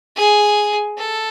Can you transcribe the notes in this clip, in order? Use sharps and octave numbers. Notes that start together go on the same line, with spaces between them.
G#4
A4